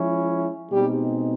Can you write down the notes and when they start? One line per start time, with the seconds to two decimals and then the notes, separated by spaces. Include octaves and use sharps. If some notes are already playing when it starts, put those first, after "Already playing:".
Already playing: F3 G#3 C#4 E4
0.70 B2 G3 G#3 C4 D#4 G4